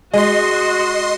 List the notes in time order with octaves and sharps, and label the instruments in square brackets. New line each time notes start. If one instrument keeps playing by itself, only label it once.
[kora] G#3 [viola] F#4 [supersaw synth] D#5 C6